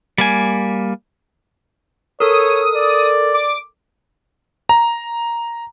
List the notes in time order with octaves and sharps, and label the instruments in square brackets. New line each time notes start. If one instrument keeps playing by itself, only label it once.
[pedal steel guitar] G3 A#3 G#5
[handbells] A4 A#4 [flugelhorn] C#5 [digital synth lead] D#6
[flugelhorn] D5
[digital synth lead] D6
[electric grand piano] A#5